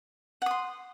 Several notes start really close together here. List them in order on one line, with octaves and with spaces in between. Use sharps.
F#5 D#6 C6